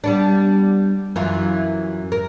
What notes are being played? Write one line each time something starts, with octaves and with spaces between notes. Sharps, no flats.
G3 B3 D4
F#2 E3 F4
A#4